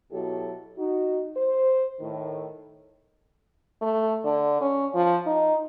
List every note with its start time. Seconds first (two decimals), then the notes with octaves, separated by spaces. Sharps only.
0.12 B2 F#3 E4 G4 A4
0.78 D#4 F#4
1.37 C5
2.01 A2 D#3
3.81 A3
4.24 D3
4.61 C#4
4.94 F3
5.26 D#4